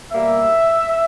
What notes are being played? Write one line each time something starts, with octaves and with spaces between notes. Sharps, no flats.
B2 G3 A#3 E5